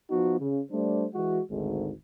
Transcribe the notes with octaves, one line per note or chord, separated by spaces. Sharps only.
F3 B3 D#4 F#4
C#3
G3 A3 D4 C5
E3 G#3 F#4
G#1 D2 G#2 A3